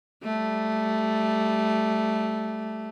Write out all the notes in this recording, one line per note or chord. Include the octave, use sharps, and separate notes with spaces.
G3 A3